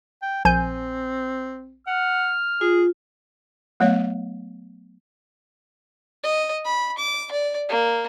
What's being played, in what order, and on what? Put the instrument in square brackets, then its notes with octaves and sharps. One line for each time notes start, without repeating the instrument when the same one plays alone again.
[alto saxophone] G5
[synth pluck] A#1 G#5 G6 [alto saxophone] C4
[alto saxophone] F#5 [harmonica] F6
[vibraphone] F4 [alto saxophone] G#4
[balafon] F#3 A3 B3 C#5 F5
[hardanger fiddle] D#5
B5
D6
D5
A#3